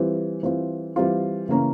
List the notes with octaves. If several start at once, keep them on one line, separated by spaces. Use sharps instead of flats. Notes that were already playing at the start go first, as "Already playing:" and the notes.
Already playing: E3 G3 C4 F4
E3 G3 C4 F4
E3 G3 C4 F4
C#3 E3 A#3 C#4